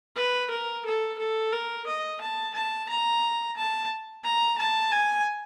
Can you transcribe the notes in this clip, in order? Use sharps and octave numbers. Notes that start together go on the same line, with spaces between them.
B4
A#4
A4
A4
A#4
D#5
A5
A5
A#5
A5
A#5
A5
G#5